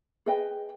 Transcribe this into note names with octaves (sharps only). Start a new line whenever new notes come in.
G#4 B4 D#5 G5